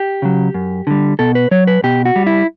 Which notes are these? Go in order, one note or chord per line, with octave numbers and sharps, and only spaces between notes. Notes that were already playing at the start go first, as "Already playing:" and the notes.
Already playing: G4
C#3 F#3
F#2
D3 G3
B2 A4
B4
F#3 C#5
B4
B2 G4
F#4
G3
E4